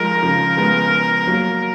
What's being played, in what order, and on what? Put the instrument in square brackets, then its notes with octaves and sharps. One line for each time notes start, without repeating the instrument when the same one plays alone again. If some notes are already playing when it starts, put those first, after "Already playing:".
Already playing: [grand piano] F3 G#3 [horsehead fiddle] A#4
[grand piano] C#3 F3
G#3 B3
F#3 A#3